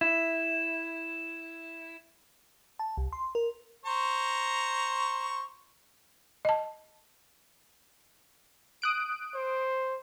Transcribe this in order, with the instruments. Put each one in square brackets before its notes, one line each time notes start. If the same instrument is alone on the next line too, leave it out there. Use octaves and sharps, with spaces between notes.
[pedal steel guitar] E4 [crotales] E7
[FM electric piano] A5
C2
C6
A#4
[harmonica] C5 A#5 C#6
[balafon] D#5 A5
[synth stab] D#6 F#6 D7
[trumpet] C5